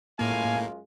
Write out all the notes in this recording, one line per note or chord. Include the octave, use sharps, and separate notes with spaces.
F#2 A2 G#3 A#3 F4 F5 G#5